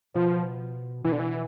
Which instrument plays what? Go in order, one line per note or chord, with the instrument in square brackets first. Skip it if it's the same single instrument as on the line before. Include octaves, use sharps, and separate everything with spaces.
[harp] B2 [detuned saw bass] F3
[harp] B2 [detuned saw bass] E3
[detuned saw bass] D3
E3